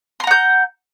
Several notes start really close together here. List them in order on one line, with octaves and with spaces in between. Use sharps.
C6 A#5 F#5 G6